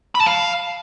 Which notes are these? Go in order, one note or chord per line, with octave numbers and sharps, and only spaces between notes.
B5
A5
F5